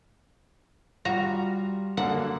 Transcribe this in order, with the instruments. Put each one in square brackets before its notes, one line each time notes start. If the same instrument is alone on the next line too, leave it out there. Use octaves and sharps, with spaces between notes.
[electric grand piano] G3 F4 [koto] F#4 A#5
[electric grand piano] F#2 D3 A#3 [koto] F#5